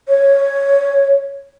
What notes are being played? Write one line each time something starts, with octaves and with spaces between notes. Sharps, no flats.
C#5